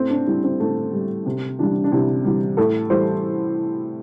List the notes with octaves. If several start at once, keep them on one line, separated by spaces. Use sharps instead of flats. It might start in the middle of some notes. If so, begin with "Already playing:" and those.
Already playing: A2 C4
D4
G3 E4
C4
A2 A3
G3
C3
E3 G3 D4
D4
C3 E4
E3 G3
A2 A4
E3 G3 C5